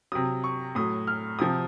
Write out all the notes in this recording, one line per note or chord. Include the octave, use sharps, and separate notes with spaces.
C3 F#3 D#6
C#6
A2 F#3 D#6
F6
C3 F3 D#6